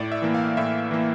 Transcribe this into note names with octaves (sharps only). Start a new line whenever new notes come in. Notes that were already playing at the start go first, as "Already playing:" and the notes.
Already playing: A2 D5
E5
E3 A#3
F5
A2 E5
E3 A#3